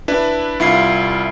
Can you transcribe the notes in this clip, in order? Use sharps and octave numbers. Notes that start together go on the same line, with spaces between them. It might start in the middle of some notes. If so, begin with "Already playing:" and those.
D4 E4 B4
C2 E4 F4 C7